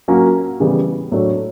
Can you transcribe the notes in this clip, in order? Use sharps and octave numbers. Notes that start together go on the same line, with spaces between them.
F#3 A#3 C#4 F#4
C#3 E3 G3 B3
A2 F#3 A3 D4